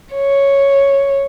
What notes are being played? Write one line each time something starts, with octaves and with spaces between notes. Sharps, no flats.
C#5